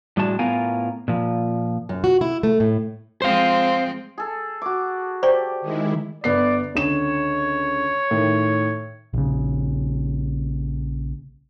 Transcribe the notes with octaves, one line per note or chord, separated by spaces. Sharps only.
A2 G3 G#3 D4 F#4 A5
A2 B3 F4 A#4 F5 G#5
A#2 F3
F#2
F#4
E4
A3
A2
F3 G#3 C4 C5 F5
G#4 A4
F#4 D6
G4 C5 D5 C#6
D#3 G#3 E4
G1 B3 D5 C7
C#2 D3 C#5 E7
A2 D#3
A#1 C#3